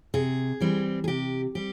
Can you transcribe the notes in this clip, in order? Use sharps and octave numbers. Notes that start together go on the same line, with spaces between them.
C3 G#4
E3 G3 C4
G#4
C3 G4
G3 C4 G4